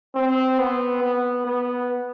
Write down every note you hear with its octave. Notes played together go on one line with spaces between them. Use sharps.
C4
B3
B3
B3